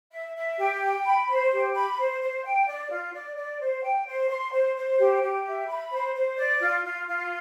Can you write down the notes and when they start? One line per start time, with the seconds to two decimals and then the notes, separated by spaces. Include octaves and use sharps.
0.12 E5
0.35 E5
0.59 G4
0.82 G5
1.05 B5
1.28 C5
1.51 G4
1.75 B5
1.97 C5
2.21 C5
2.43 G5
2.67 D5
2.90 F4
3.13 D5
3.36 D5
3.60 C5
3.83 G5
4.06 C5
4.29 C6
4.52 C5
4.75 C5
4.98 G4
5.22 G4
5.44 E5
5.68 B5
5.91 C5
6.14 C5
6.37 D5
6.60 F4
6.84 F4
7.07 F4